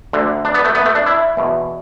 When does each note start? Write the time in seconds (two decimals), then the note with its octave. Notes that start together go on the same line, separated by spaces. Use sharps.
0.13 D2 D3
0.45 D4
0.54 B3
0.65 A3
0.75 B3
0.85 A3
0.95 D4
1.06 E4
1.37 E2 B2